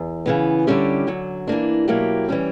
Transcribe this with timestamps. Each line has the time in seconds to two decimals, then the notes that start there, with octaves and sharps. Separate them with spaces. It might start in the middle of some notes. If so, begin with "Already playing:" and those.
Already playing: E2
0.26 C#3 E3 B3
0.67 D3 G3 C#4 E4 G4
1.07 F#2 D3 F#3
1.47 E3 A#3 D4
1.88 B2 F#3 A#3 E4 G4
2.29 E3 G3 C#4